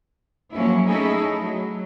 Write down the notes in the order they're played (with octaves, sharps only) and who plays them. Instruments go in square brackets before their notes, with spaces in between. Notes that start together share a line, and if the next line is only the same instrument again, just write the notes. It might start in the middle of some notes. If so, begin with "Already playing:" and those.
[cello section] F3 F#3 A#3 C#4 E4
A3 C#4 D#4 E4 G#4 A4
F#3